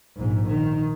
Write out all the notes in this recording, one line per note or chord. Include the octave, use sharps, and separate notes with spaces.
A#1 G#2
D#3